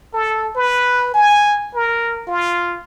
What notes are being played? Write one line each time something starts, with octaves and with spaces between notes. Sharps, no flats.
A4
B4
G#5
A#4
F4